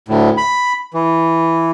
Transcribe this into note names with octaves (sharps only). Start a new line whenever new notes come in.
D2 A2
B5
E3